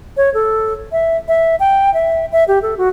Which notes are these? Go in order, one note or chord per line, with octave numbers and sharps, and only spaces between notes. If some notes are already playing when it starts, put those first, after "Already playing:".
C#5
A4
E5
E5
G5
E5
E5
G4
A4
F#4